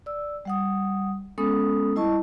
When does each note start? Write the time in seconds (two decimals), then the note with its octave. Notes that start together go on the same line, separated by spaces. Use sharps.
0.06 D5 E6
0.45 G3 F#5 D#6
1.38 G#3 B3 C#4 A4 D#6
1.96 G3 E4 D#5 A5 C#6